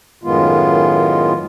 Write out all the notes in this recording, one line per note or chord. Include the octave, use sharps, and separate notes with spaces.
F#2 A2 D#3 G#3 B3 F4